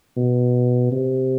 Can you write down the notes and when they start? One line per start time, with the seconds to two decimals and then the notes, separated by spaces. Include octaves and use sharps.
0.17 B2
0.92 C3